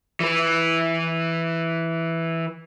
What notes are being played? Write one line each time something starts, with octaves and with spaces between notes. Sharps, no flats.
E3 B4